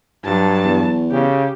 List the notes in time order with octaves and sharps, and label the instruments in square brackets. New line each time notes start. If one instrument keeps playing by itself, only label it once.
[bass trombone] G2 [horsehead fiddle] F#3 A5
[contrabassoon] E2
[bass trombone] C#3 [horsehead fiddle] G4